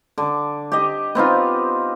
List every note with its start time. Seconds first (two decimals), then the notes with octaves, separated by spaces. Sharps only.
0.18 D3
0.72 G4 D#5
1.15 B3 C4 D#4 F4